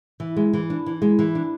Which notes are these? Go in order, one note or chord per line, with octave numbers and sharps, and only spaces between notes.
E3
G#3
E3
D4
E3
G#3
E3
D4